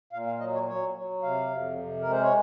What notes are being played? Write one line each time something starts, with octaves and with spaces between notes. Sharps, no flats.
A#2 F5
F5
F#3 D#5
C#5
F#3 C#5
F#3
C3 F5
F2
C3
G#3 A#4
C5
C#5